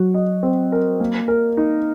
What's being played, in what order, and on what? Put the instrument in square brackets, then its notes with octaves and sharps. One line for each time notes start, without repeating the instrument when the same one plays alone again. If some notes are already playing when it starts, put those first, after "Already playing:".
Already playing: [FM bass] F#3 [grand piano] F#4
[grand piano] D#5
C4
A#4
A#3
A#4
D#4